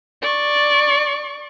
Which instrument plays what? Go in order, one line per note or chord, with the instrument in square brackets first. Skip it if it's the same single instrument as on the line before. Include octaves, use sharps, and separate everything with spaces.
[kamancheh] D5 C#6